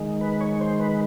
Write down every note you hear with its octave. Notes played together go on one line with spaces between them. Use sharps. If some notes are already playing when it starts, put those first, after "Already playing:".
Already playing: D#3 G#3
B4
C#5
C5
B4